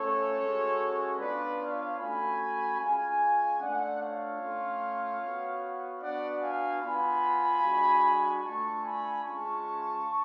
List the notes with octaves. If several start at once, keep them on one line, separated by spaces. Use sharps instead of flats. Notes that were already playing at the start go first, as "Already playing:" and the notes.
Already playing: A3 C#4 F4 A4 C#5
G#3 C#4 F#4
B3 D4 F4 B4 D5
C#5 F5
A3 C#4 F#4 G#5 B5
G#3 C#4 F4 F5 G#5
A3 D4 F4 D5 F#5
C#5 F5
A3 C#4 F4
B3 F#4
B3 D4 F#4 D5 F#5
F5 G#5
B3 F4 G#5 B5
G#3 D4 F#4
A3 D4 F4 A5 C#6
G#5 B5
G#3 C#4 F4 A5 C#6